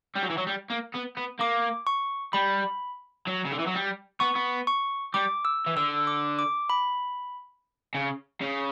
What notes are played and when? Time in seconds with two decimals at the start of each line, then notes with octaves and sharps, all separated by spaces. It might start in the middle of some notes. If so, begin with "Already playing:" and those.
0.15 G3
0.23 F#3
0.30 E3
0.38 F#3
0.47 G3
0.70 A#3
0.94 B3
1.17 B3
1.40 A#3 D6
1.87 C#6
2.33 G3 B5
3.27 F#3
3.45 C#3
3.52 D3
3.59 E3
3.67 F#3
3.74 G3
4.20 B3 C#6
4.36 B3
4.67 C#6
5.14 G3 D6
5.45 E6
5.66 E3
5.77 D3 E6
6.07 D6
6.39 D6
6.70 B5
7.95 C#3
8.41 C#3